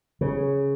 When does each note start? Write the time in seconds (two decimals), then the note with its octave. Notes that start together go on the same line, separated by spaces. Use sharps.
0.21 C#3